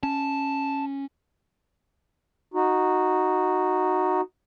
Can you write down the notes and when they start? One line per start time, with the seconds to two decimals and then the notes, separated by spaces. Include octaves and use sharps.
0.03 C#4 A5
2.54 D#4 F#4